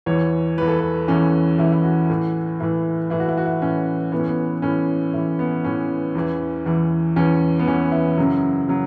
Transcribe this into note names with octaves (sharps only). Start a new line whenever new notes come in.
E2 E3 C#5
E2 E3 B4
A4
B4
E2 E3 C#4
E2 E3 E4
E4
F#4
A2 E3
A2 E3 E4
A2 E3 E4
F#4
E4
F#4
E4
A2 E3 C#4
A2 E3 B3
C#4
B3
A2 E3 C#4
A2 E3 E4
B3
A2 E3 C#4
E2 E3
E2 E3
E2 E3 C#4
B3
E2 E3 C#4
E4
F#2 C#3 F#3
C#3 F#3